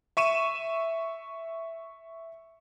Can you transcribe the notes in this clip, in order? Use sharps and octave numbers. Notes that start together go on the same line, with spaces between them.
E5 C#6 D#7 E7